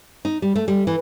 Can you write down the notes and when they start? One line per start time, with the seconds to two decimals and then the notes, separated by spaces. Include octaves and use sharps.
0.25 D#4
0.42 G3
0.56 A3
0.68 G3
0.87 E3